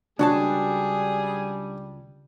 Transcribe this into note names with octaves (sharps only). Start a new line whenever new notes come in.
C#2 G3 D4 F#4 G#4 G#5 A5